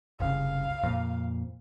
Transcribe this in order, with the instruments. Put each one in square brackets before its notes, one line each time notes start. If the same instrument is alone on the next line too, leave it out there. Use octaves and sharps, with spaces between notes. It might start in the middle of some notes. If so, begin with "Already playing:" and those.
[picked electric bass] F#1 C2 C#3 [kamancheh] F5
[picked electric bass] F2 A#2